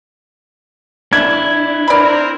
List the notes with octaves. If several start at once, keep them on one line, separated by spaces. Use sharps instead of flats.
D4 E4 G#6
C4 A#4 D5 B5